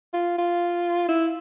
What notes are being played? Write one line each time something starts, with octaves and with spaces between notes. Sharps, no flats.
F4
F4
E4